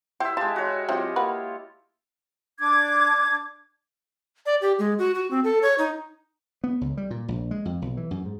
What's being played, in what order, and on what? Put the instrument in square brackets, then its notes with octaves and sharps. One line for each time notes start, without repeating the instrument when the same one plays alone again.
[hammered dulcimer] E4 [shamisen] G4 [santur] C5 E5
[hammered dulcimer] G#3 G4 [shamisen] F4 [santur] A5
[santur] F#4 C#5
[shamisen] F#3 C4 E5 [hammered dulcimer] E4 G4 D#5 [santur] F4
[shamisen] A#3 F#4 B4
[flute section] D4 D6 G#6
[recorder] D5
G4
G#3
F#4
F#4
C4
A4
C#5
D#4
[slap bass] B3
C#2
G3
A#2
A#1
G#3
F2
B1
E3
F#2
G#2